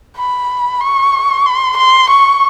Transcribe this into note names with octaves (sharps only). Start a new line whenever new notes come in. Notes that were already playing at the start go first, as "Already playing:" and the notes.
B5
C#6
C6
C6
C#6